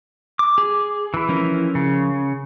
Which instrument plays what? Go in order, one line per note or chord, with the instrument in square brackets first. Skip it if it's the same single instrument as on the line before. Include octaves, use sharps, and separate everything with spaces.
[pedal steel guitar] D6
[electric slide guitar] G#4
[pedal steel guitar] E3 E4
[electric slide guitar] F3 C#4 A#4
[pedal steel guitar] C#3